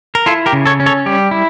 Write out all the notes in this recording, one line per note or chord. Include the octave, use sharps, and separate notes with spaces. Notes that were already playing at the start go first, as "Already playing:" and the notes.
A#4
E4 F4 A4
G4 A#4
C#3
A4 C#5
C#4
A4 C#5
G3 G4
E4